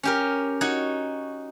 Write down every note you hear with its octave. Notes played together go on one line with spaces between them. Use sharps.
C#4 G4 A#4
D#4 F#4 C#5